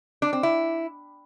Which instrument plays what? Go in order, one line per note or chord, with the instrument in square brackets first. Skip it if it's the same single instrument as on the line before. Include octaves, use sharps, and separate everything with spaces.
[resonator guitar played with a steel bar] D4
C4
E4